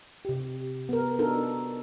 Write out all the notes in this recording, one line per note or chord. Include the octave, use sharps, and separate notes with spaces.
C3 G4
B3 A#4
D4 D#4 F#4 A4 A#4